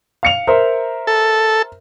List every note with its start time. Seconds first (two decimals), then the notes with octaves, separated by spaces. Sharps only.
0.23 F5 C#7 F7
0.47 A#4 C5 E5
1.07 A4